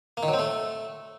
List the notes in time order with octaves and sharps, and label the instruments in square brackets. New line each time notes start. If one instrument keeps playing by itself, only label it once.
[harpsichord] A#3
D#3
F#3
C4
A3